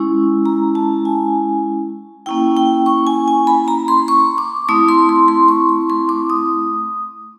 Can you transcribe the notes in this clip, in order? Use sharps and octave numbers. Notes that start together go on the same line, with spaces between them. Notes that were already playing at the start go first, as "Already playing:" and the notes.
Already playing: G#3 C#4 E4
A#5
A5
G#5
A#3 C#4 E4 G5
G5
C#6
G#5
G#5
B5
A#5
C6
C#6
D6
A3 C4 E4 D#6
C6
C6
C6
C#6
C#6
C6
D6
D#6